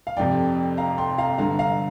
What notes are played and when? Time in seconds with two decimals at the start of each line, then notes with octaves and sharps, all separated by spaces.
0.07 F5
0.17 F1 F2 C3 D5 G5
0.77 F5 A#5
0.98 G5 C6
1.18 F5 A#5
1.38 G1 G2 D3 F5 A#5
1.59 F5 A#5